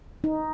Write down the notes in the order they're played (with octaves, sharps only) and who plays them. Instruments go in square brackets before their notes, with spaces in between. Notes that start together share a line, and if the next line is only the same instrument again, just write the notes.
[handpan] D#4